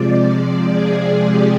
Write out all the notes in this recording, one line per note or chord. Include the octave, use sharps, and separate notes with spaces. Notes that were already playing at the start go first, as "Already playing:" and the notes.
Already playing: C3 F3 G#3 D5
D5
G#4
G4